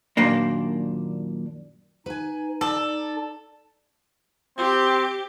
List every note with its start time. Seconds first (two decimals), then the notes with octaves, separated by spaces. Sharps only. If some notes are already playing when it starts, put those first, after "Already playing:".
0.17 F#2 A#2 D#3 A#3 D4
2.06 D#4 B4 G#5
2.61 A4 D5
4.57 C4 G4